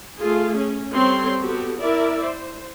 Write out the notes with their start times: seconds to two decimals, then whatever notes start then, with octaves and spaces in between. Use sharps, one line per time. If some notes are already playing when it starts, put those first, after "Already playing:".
0.19 A3 F4 G#4
0.56 C#4
0.95 G3 C4 A4 C#5 C6
1.41 B3 F#4 G4 A4
1.81 E4 A#4 D5 E5
2.24 C5